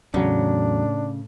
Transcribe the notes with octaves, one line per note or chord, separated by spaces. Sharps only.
E2 A2 C#3 F#3 D4